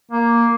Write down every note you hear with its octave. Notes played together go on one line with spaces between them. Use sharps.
A#3